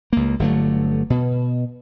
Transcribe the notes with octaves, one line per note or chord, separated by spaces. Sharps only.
C#2 A#3
G1 D3 F#3 A3
B2